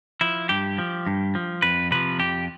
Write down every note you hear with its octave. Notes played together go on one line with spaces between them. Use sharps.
F3 E4
G2 G4
F3
G2
F3
F2 B4
C3 F3 B4
F2 G4